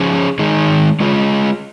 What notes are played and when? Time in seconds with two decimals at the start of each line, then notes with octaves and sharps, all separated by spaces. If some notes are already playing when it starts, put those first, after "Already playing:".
Already playing: F3 C#4 G#4
0.39 D#3 G#3 D#4 G#4
1.00 G#3 F4 G#4